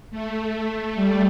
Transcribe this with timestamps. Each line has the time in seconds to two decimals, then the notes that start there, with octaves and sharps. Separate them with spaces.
0.11 A3
0.39 A3
0.95 G3